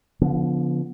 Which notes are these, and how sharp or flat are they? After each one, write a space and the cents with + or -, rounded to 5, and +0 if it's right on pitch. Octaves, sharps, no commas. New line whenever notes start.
D3 -40 F3 +0 B3 -5